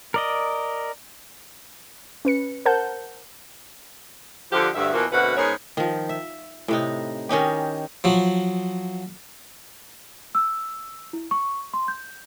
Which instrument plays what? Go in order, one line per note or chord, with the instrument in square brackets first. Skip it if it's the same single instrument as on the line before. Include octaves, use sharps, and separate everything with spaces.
[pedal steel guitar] A#4 D5 D#5
[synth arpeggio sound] C#4 B4 C#7
A#4 C5 F#5 A5 G6
[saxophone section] D3 F3 G4
D2 G2 E5
B2 E3 F3 A#3
D2 B2 C4 A#4 B4 F#5
G#2 B3 C#4 G#4 A#4 C#5
[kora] D#3 F3
E5
A2 C3 D#4
D#3 C#4 D#4 G4
[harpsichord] F3 F#3
[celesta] E6
E4
C#6
C6
G6